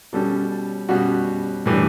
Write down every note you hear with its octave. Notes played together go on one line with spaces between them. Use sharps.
B2 G3 C#4 A4
B2 G3 C#4 F#4
A2 E3 G3 D4